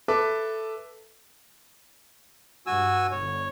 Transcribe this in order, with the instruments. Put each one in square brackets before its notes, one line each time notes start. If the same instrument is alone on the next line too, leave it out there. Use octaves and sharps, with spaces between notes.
[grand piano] A4 B4 E5 A5 D6
[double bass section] G2 [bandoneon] F#4 G#5 E6
[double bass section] G1 [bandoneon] C#5